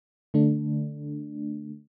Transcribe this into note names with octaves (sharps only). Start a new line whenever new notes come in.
D3 A3 D4